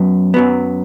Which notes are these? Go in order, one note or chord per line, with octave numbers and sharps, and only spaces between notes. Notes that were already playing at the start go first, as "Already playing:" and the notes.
Already playing: F#2 F#3 B3
F#2 F#3 B3